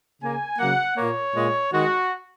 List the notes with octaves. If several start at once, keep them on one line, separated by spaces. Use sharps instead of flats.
C#3 A#3 G#5
C#3 F#3 A#3 F#5
A#2 A#3 C#5
A#2 G#3
D#3 G#3 F#4